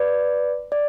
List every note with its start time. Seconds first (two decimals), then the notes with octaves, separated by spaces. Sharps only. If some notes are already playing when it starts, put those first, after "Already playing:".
Already playing: B4 D5
0.72 D5